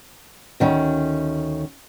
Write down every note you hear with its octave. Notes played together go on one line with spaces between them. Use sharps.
D2 D#3 C#4